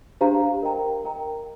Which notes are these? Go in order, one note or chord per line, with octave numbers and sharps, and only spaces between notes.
D4 G4 C5 F5 A#5
A#4 D#5 G5 A#5
A#4 D#5 G5 A#5